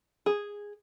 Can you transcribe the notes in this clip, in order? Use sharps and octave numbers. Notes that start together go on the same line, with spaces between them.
G#4